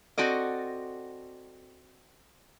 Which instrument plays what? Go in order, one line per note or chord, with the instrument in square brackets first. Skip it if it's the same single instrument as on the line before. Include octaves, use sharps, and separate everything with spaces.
[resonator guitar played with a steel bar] C4 F#4 A4 D5 D#5